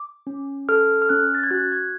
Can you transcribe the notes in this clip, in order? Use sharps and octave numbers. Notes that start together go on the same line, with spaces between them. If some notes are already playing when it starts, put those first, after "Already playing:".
Already playing: D6
C#4
A4 F6
F6
C#4 F#6
A6
G#6
F#4 F#6
G#6